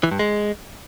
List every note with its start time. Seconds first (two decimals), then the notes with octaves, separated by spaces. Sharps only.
0.03 E3
0.11 G2
0.19 G#3